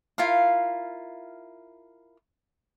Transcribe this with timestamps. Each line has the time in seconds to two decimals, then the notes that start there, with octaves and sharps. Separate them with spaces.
0.18 E4 F4 A#4 F5